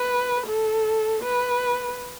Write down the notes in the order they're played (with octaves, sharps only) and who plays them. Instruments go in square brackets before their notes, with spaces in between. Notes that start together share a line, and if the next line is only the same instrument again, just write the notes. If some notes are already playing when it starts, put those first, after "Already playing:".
Already playing: [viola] B4
A4
B4